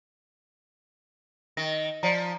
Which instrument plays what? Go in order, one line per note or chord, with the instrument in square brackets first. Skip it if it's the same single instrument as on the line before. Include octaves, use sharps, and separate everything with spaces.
[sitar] D#3 [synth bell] A#6
[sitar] F3 [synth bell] D5 A#5